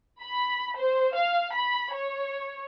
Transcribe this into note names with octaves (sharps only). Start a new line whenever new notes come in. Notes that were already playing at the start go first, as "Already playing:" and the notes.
B5
C5
F5
B5
C#5